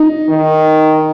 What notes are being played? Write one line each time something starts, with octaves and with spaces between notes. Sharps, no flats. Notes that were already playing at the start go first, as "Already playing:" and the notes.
Already playing: D#4
D#3